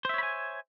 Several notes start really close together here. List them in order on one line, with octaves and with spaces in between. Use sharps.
C5 E5 C#5 B5 G#5